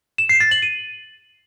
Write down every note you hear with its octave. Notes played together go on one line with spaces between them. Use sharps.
E7
C7
A6
F#7
D#7